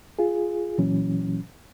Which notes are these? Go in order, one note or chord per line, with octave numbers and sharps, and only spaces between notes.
F4 G#4
C#2 A#2 E3 F#3 C#4